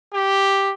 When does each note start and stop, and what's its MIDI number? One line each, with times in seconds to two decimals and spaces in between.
0.13 0.72 67